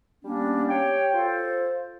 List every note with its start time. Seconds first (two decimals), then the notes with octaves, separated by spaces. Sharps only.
0.23 G3 A#3 B3 C#4 D4
0.68 G4 C#5 G5
1.12 F4 A4 C5